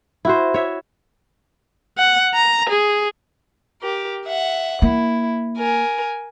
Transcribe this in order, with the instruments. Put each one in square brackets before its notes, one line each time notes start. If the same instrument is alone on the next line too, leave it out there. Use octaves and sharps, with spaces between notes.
[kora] E4 F#4 C5
C#5 E5
[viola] F#5
A#5
G#4
[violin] G4 A#4
E5 F#5
[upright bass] A#3 [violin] E4
[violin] A#4 G#5